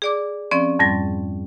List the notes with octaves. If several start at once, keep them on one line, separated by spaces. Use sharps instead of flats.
G#4 D5 D6
F3 C4 C#4 D5
F2 G#2 G3 A6